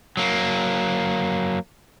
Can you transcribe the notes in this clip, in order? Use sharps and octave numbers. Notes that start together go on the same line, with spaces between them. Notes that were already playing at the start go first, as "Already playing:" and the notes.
F#3 A#3